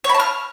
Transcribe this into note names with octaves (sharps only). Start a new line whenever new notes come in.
C#5
B5
A5
F6